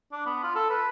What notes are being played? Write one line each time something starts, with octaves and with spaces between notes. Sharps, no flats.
D4
B3
F4
A4
B4